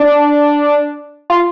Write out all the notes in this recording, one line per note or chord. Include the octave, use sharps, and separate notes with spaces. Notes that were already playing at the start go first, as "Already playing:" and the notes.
Already playing: D4
F4